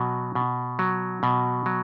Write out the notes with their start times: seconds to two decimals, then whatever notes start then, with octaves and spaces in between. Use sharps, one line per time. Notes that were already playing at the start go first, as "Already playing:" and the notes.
Already playing: B2 F#3
0.35 B2
0.79 F#3
1.23 B2
1.66 F#3